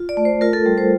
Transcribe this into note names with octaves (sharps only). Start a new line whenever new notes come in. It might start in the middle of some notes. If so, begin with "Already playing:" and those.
Already playing: F4
D5
A3
C5
F4 A#4
A4
G3
C5